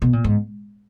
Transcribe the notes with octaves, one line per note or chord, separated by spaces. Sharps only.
B2
A#2
G#2